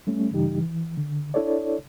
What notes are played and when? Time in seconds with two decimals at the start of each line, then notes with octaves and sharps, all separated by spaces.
0.07 G3 A3 C#4
0.31 G2 C#3 E3 G3 D#4 G4
0.60 E3
0.97 D3
1.34 D4 E4 A4 C#5 D5